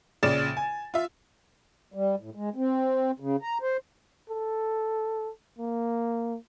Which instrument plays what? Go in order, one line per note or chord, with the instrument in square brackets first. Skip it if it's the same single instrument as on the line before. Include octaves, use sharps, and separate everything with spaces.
[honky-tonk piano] A#1 C#3 D5 A6 E7
G#5
F4 E5
[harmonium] G3
A2
G#3
C4
C#3
A#5
C5
[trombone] A4
A#3